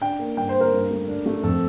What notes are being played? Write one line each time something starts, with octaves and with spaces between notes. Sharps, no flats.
D4 G5
A#3
G2 G5
C5
A#3
A#4
G2
A3
D4
A3
F2 A4